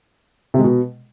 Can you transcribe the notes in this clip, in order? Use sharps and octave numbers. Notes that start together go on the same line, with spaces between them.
C3
G#3
B2